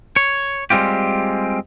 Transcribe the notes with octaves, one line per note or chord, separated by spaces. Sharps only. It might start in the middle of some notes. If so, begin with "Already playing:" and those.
C#5
G3 G#3 C4 F4 G4